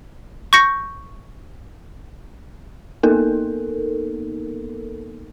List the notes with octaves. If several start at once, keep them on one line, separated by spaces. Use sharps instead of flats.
C#6 G6 A#6 C#7
A#3 B3 D#4 A4 A#4